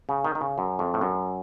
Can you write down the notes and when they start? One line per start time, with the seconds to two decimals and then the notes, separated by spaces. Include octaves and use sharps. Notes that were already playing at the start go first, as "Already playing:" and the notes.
0.09 C#3
0.25 D#3
0.35 D#3
0.41 C#3
0.58 F#2
0.79 F2
0.94 A2
1.01 F#2